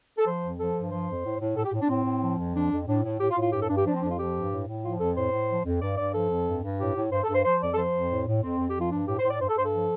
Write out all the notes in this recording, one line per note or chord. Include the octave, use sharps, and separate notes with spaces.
A4
F3 C5
F2
F3 A4
G2
F3 C5
F2
A2
A2
A2 A4
G4
A2
D4
A2 C4
A2
F3
F2
F3 D4
F2
A2 D4
A2
A2 G4
F4
A2
F4
G2 G4
A4
G2 D4
G4
F3 D4
C4
F2 D4
F4
F3 G4
G2
A2
A2
F3 F4
F2 A4
A2 C5
A2
F3
F2
G2 D5
G2 D5
F3 A4
F2
G2
G2
A2 G4
A2
G2 C5
A4
G2
C5
F3 C5
F2 D5
A4
F3 C5
F2
A2
A2
F2 C4
F2
G4
F3
F4
G2 D4
A2 G4
C5
A2
D5
G2 C5
A4
G2 C5
A4
F3